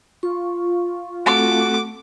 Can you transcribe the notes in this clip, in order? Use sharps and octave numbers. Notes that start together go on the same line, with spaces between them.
F4 C#6
A3 C4 F#4 A4 D6